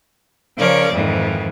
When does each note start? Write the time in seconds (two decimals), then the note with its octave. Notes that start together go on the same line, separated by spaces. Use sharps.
0.57 C#3 F3 A#4 C#5 D5
0.94 F2 G#2 D#3 E3